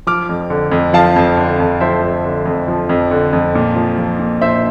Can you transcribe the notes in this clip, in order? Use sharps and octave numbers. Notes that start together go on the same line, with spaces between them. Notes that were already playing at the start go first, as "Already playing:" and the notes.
F3 D6 F6
F2
D3
F2
F3 F5 A5
F2
D3
F2
F3 C5 E5
F2
D3
F2
F3
F2
D3
F2
A#2
F3
F3
A#2
A#2 C5 E5